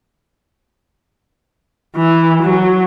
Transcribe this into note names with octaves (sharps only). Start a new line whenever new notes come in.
E3
F#3